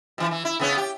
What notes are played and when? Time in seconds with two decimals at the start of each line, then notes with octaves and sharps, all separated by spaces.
0.18 B2 E3 F3
0.31 E3
0.45 E4
0.60 C#3 B3 C#4
0.77 G4